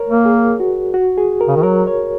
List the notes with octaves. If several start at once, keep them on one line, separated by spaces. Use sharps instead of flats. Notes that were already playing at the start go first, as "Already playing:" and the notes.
Already playing: A#4 C#5
A#3
G#4
F#4
F#4
G#4
A#4
C#3
D#3
F#3 A#4
C#5